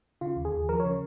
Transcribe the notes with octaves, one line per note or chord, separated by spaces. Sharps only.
C#3 F4
D#2
G#4
D#2
F3 A#4
C#5
C#3